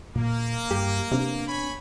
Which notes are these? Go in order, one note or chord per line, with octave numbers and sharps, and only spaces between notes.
A#2 A#3
G2 G4
C3 B3 C4 D4
C#5 G#5 B5